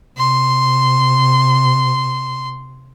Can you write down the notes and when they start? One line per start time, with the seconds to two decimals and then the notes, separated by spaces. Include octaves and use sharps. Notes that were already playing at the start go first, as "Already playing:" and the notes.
0.18 C3 C6